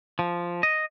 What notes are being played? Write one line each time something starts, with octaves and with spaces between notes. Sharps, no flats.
F3
D#5